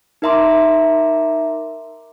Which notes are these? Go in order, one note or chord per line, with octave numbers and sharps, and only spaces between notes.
D#4 A#4 E5 A#5 C6 D6